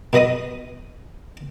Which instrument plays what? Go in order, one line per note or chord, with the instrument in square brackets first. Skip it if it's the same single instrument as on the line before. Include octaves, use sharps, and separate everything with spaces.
[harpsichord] B2 B4 D#5 B5 D#6